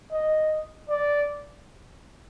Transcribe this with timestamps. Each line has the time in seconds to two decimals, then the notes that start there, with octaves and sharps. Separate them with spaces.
0.12 D#5
0.89 D5